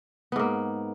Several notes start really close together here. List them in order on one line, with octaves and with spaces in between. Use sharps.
B3 G#2 A#3